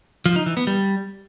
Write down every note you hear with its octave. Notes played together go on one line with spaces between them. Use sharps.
F3
D#4
E3
B3
G3